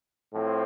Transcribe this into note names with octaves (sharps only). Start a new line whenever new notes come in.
A2 F3 C4